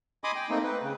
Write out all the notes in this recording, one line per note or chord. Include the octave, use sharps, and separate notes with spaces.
D#5 G#5 B5 C6 D6 D#6
G5
A3 A#3 C4 D#4
B4
C#3